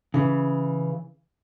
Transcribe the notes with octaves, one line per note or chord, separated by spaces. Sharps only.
C#3 E3